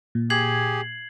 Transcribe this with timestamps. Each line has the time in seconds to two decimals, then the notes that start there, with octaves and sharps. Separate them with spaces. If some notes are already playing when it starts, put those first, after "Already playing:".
0.15 A#2
0.30 G4 G#4 G#6 C7 F#7